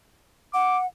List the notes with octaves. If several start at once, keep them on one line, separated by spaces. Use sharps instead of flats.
F#5 D6